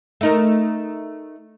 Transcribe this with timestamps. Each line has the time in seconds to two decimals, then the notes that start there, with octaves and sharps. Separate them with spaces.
0.21 A3 D#4 A#4